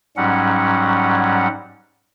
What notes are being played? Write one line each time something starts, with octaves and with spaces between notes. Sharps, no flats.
G#2 F#3 G3 C#4 F#5